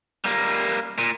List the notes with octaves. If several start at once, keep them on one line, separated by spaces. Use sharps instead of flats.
G3 A#3
A#2